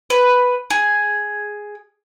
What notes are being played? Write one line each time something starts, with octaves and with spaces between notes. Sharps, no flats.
B4
G#4